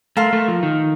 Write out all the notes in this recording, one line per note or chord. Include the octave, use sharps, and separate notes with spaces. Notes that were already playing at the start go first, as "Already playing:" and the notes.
A3 A#4 F5 C6
A3
F3
D#3